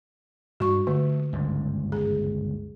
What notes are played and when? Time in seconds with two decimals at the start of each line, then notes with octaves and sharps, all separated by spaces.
0.60 G2 F#4 C#6
0.87 D3 A3
1.33 G1 C#2 G#2
1.92 G#4